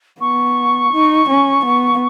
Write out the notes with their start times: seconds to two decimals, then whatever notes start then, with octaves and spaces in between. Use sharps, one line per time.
0.21 B3 C#6
0.93 D#4
1.29 C#4
1.66 B3